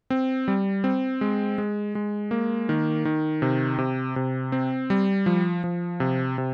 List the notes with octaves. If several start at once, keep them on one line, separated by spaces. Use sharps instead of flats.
C4
G3
C4
G#3
G#3
G#3
A#3
D#3
D#3
C3
C3
C3
C4
G3
F3
F3
C3
C3